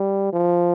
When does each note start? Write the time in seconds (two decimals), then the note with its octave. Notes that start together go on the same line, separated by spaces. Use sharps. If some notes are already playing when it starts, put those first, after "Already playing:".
Already playing: G3
0.33 F3